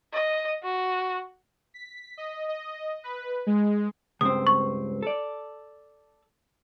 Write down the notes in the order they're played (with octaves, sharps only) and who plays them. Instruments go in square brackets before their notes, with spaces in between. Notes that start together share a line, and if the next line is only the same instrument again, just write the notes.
[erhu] D#5
F#4
[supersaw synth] B6
D#5
D#5
B4
G#3
[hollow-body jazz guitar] C#2 G2 C4 [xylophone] D#6
[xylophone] C#6
[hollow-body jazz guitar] A4 D5